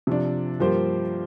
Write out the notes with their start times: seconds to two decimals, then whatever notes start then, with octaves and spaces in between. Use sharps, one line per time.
0.07 C3 F3 D4
0.60 G2 F3 A#3 G4 C5